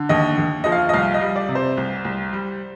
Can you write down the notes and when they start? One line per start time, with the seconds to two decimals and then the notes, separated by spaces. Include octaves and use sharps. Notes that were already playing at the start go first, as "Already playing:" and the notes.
Already playing: D3
0.09 D#2 D#5
0.38 D#2
0.64 F3 D#5
0.72 F5
0.89 D#5
0.94 C2 F5
1.14 D#5
1.21 G3
1.36 D5
1.49 C3
1.55 C5
1.77 C2
2.05 C2
2.33 G3